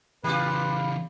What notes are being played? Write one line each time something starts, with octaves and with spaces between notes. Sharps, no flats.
C#3 E3 F4 G4 B4 B5